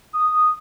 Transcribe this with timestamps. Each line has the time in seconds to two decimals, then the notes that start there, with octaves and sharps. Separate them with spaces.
0.13 D#6